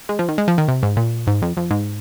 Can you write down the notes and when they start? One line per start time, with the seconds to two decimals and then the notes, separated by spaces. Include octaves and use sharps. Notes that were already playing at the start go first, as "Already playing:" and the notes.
0.09 G#3
0.19 F3
0.28 D#3
0.38 G#3
0.48 F3
0.58 D#3
0.68 C3
0.83 G#2
0.97 A#2
1.27 G#2
1.42 F2
1.57 F2
1.71 G#2